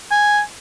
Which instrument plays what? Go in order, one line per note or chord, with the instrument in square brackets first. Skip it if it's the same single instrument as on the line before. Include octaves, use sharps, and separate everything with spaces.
[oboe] G#5